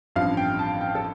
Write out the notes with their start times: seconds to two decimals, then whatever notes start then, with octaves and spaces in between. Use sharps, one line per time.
0.16 A1 G2 F3 C4 F5
0.37 G5
0.59 A5
0.81 G5
0.95 A4